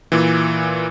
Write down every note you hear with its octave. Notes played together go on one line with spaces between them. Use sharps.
A#2 E3